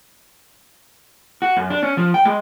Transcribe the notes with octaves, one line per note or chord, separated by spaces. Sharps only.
F#4
F#2
D4
C#4
F3
G5
G#3